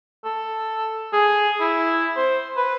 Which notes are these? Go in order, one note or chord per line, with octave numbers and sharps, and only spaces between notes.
A4
G#4
E4
C5
B4